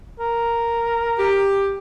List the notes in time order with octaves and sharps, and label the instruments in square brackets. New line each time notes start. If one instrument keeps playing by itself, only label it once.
[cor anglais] A#4
[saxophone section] G4